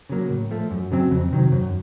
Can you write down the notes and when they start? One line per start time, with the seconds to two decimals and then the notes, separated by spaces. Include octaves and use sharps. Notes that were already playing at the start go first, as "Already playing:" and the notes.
0.09 C#3 F#3 A#3
0.30 A2
0.51 F3 A3
0.71 F#2
0.92 C#3 F#3 C4
1.11 F2
1.32 C3 D#3 F#3
1.52 F#2